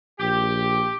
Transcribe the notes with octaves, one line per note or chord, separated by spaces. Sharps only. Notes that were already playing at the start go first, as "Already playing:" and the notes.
A#1 G4